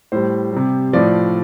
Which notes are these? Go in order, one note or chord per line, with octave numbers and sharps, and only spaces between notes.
A2 G3 C5
C3 G3
A2 F3 D5